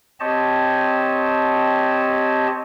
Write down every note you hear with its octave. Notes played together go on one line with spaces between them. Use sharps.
C4 G4 C#5 D#5 A5